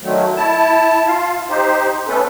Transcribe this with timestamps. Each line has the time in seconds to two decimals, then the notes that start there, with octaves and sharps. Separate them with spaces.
0.02 D3 D#3 F#3 A3
0.36 E4 A5
1.07 F4 F5
1.49 D#4 G4 C5
2.08 A3 B3 C#4 A4 B4